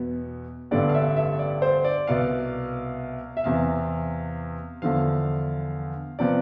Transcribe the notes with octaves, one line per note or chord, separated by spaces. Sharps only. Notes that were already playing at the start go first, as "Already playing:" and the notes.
Already playing: E2 B2 B3
A1 G2 D3 G3 B3 D5
F5
E5
E5
D5
C5
D5
C2 B2 B3 F5
E5
E2 C3 E3 F5
E2 D3 F3 F5
C3 F3 B3 D5